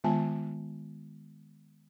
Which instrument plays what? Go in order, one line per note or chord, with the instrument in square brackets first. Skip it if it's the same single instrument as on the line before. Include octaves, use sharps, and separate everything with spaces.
[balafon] D#3 G#3 B3 F4 G#5 A5